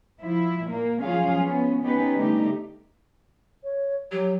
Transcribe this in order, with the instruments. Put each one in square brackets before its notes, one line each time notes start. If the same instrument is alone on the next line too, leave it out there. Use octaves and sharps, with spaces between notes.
[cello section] F3 E4
A#2 A#3
F3 F#3 C#4 F4 G#4 F5
B3 C#4
B3 C#4 D#4 G4 B4
D3 G3 A3 D#4 G4
[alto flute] C#5
[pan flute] F#3 [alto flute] G4